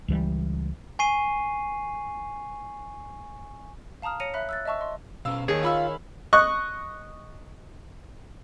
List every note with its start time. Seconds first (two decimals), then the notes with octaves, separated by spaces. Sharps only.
0.08 C#2 E3 G3
0.99 G#5 C#6 C7 D#7
4.02 F5 A5 A#5 D#6 F6
4.20 C#5 A#6 C#7 D#7 F7
4.34 E5 B5 F#6 B6
4.49 E6 F#6 A6
4.65 D#5 E5 A5 C#6 E6
4.81 D#5 C6
5.25 B2 C#4 F5 E6
5.48 D#2 D#3 G#4 C#5
5.63 F4 F5 B5 E6
6.33 D#5 C#6 F#6